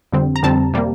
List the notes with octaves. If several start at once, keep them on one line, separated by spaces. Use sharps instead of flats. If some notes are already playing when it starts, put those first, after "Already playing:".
F2 D3 G3 C4
A#5
F2 D3 G3 C4 A5
C3 G3 A#3